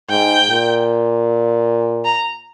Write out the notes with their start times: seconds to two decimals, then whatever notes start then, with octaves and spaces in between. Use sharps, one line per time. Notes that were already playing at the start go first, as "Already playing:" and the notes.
0.09 G#2 G5
0.49 A#2
2.05 A#5